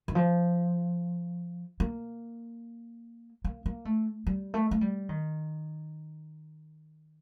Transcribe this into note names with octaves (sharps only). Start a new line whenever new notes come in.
D#3
F3
A#3
A#3
A#3
A3
G3
A3
A3
G3
D#3